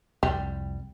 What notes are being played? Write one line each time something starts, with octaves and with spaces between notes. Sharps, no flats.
C2 F2 G3